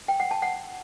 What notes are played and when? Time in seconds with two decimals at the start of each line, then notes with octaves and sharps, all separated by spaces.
0.08 G5
0.20 F#5
0.31 A5
0.42 F#5